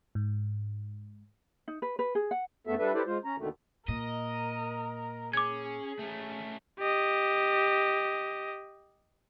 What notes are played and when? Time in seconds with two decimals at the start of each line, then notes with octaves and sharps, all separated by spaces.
0.15 G#2
1.68 D#4
1.82 B4
1.99 B4
2.15 G#4
2.31 F#5
2.67 F2 C#3 A3 B3 A4 E5
2.79 G3 D4 A4 B4 E5
2.94 E4 G4 A4 B4 C5 D5
3.07 G#3 F4 C5
3.24 C#4 A#5
3.38 D#2 B2 D3 D#3 A3
3.88 A#2 A#4 D#5
5.33 C#4 G#4 D6 G#6
5.99 A3 C#4
6.79 G4 D#5